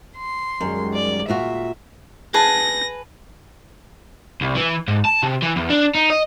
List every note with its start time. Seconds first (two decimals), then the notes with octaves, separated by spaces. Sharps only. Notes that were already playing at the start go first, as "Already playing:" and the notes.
0.17 C6
0.61 F#2 D#3 G3 G#3
0.94 D5
1.29 A#2 F4 F#4 E5
2.34 G#4 B4 A5 A#6
4.41 C2
4.55 E3
4.88 G#2
5.05 A5
5.23 C3
5.42 E3
5.56 E2
5.70 D4
5.95 D#4
6.10 D#5